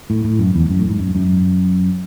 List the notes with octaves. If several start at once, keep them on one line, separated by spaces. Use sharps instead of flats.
A2
A2
F#2
E2
F#2
A2
G#2
F#2
F#2